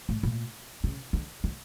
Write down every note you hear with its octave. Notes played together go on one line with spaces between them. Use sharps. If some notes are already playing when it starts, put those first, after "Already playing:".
A2
A#2
C#3
D3
D3